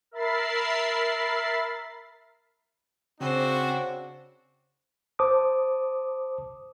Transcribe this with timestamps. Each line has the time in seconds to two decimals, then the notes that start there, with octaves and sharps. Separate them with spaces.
0.11 A#4 E5 B5 A6 C7
3.21 C#3 C4 D4 F#4 C5
5.19 C5 A5 D6 D#6